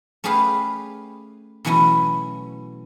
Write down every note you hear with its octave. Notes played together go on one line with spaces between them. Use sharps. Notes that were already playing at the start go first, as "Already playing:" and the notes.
A3 C#4 G4 G#4 B4 F5
B2 E3 F#3 A3 C#4 E4